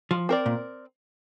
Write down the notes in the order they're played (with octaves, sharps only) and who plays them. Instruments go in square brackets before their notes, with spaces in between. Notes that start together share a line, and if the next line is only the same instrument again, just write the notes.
[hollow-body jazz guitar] F3
[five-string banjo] C4 A#4 D5
[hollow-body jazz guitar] A#2